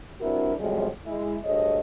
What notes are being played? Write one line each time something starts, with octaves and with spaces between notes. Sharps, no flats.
G2 C4 D4 E4 F#4 A#4
F#2 A2 C3 F3 G3 G#3
G#3 E4
D2 G2 G#4 A4 C#5 D#5